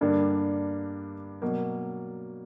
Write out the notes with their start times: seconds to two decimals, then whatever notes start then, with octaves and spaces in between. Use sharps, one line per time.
0.01 G2 D3 G3 A#3 D4
1.42 B2 F#3 A#3